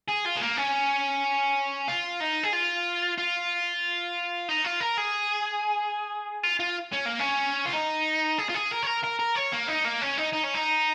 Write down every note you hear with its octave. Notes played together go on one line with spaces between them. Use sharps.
G#4
F4
G#3
A#3
C#4
F4
D#4
G#4
F4
F4
D#4
F4
A#4
G#4
F4
F4
C#4
A#3
C#4
F4
D#4
G#4
F4
G#4
A#4
C#5
A#4
A#4
A#4
C#5
A#3
D#4
A#3
C#4
D#4
D#4
C#4
D#4